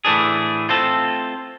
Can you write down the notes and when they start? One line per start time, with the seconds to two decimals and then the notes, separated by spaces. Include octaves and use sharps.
0.05 A2 E3 A3 D4 G#4
0.69 A3 C4 F4 A4